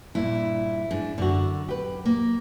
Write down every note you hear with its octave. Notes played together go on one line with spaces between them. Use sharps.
G2 A#2 D4 E4
G#2 D4
F#2 D3 F#4
G4 B4
A#3